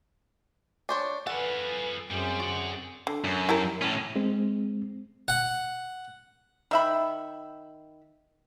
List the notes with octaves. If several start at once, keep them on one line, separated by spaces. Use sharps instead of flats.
D4 C5 C#5
F4 A4 B4 F#5 G#5
F#2 G3 C4 G#4 C5
F#4 D5 F#5
D3
F#2
E4 G4 A#4
A2 C#4
G#3 C4
F#5
D#3 E5 B5